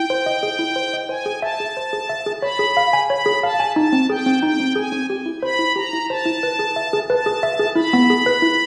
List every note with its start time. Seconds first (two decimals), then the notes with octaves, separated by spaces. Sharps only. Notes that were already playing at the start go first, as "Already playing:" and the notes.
Already playing: E4 G5
0.10 C5
0.26 D#5
0.43 G#4
0.59 E4
0.76 C5
0.93 D#5
1.09 C5 G#5
1.26 G#4
1.42 E5 A5
1.60 G#4
1.77 C5
1.93 G#4
2.09 E5
2.26 G#4
2.42 C#5 B5
2.59 G#4
2.77 F5
2.93 G#5
3.09 C#5 B5
3.26 G#4
3.43 F5 A5
3.60 G#5
3.76 D#4 A5
3.93 C4
4.10 G#4 G5
4.26 C4
4.43 D#4 G5
4.60 C4
4.76 G#4 G#5
4.92 C4
5.10 G4
5.26 E4
5.42 C5 B5
5.59 E4
5.76 G4 A#5
5.93 E4
6.09 C5 A5
6.26 E4
6.43 B4
6.59 G#4
6.76 E5
6.93 G#4
7.10 B4 A5
7.26 G#4
7.43 E5
7.59 G#4
7.76 E4 B5
7.93 B3
8.10 G#4
8.26 B4
8.42 E4